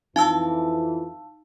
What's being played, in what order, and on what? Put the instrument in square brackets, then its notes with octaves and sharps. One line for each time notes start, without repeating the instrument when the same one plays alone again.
[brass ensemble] F2 E3 [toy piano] D#4 [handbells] F5 A5 E6